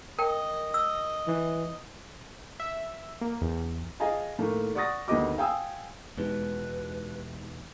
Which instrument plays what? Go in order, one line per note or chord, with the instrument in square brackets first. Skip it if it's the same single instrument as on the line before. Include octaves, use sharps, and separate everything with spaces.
[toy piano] A#4 G5 [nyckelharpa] D#5
[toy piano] E6
[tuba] E3
[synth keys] E5
A#3
E2
[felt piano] G#4 D#5 F5 G#5 A5
A2 D#3 A3 A#3
D5 F#5 C#6 D#6 A6 A#6
D2 D#3 B3 G4 D#5 D6
F5 G5 G#5 D#6 E6
[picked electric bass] E2 B2 [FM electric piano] G#3 D#4 G4 [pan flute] B4